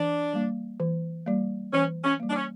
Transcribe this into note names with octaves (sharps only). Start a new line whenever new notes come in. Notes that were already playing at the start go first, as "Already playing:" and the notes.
Already playing: E3 D4
G3 A#3
E3
G3 A#3
E3 C#4
C#4
G3 A#3
D4
C#4